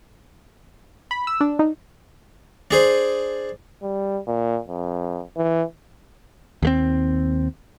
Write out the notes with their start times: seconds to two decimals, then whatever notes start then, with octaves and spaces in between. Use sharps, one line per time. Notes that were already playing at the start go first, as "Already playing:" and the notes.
1.11 B5
1.27 E6
1.41 D4
1.59 D#4
2.71 D4 G#4 C5
3.83 G3
4.27 A#2
4.68 F2
5.37 E3
6.63 D#2 A3 C4